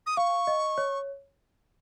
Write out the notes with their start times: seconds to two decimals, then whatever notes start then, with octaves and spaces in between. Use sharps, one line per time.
0.06 D#6
0.17 F5 C#6
0.47 D#5
0.78 C#5